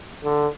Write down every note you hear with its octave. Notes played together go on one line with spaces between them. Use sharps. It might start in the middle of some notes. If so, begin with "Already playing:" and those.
D3